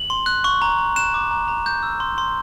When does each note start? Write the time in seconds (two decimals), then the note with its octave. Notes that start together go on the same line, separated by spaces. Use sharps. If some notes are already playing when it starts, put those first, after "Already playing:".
Already playing: F#7
0.10 C6
0.26 F#6
0.44 C#6
0.62 A#5
0.79 A#5
0.96 F#6 E7
1.14 D6
1.31 A#5
1.48 A#5
1.66 G6
1.83 E6
2.00 C6
2.18 C6